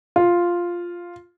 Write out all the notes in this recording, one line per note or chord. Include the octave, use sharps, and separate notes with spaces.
F4